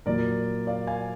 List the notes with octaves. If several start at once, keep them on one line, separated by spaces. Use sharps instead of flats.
A#2 F#3 A#3 A#4 D5
D5 F5
F5 G#5